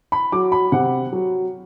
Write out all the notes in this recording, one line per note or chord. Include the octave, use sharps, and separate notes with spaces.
B5
F#3 D6
B5
C3 F#5
F#3